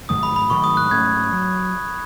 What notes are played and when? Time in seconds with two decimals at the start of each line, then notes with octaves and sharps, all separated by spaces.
0.09 G#2 D#3 F#3 A3 D#6
0.23 B5
0.36 B5
0.50 G#2 D#3 F#3 A3 C#6
0.64 D#6
0.77 F#6
0.91 G#2 F#3 A3 C#4 G#6
1.32 F#3